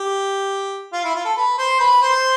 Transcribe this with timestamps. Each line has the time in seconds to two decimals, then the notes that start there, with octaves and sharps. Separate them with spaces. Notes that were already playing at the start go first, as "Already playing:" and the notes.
Already playing: G4
0.93 F4
1.04 E4
1.15 F4
1.25 A4
1.37 B4
1.58 C5
1.80 B4
2.02 C5